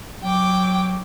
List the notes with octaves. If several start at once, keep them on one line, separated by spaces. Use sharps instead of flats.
F#3 G5 D6